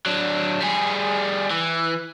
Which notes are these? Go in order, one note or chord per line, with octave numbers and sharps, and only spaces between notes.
F#3 D4
G3 G#4
E3